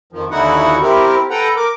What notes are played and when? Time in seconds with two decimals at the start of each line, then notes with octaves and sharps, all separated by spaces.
0.13 F2 D#3 F3
0.31 D#2 D3 D#4 E4 F#4 F#5
0.82 C4 E4 G4 A#4
1.30 A4 B4 F#5 G5 A#5
1.57 A#4 D6